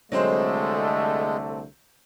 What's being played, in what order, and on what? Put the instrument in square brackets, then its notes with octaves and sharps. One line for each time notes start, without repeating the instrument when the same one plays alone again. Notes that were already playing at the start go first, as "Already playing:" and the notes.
[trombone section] C2 D3 A3 [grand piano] F#3 C4 C5 [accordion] G#3